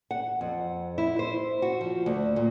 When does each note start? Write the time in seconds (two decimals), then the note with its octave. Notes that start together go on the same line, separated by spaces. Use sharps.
0.11 F#5
0.41 F2
0.98 E4
1.19 C5
1.62 F#4
1.81 F3
2.06 D2
2.36 A#2